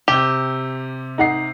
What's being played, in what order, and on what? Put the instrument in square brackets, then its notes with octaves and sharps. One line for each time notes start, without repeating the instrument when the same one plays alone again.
[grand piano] C3 G7 [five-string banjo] G4
[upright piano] D#4 F#5 C7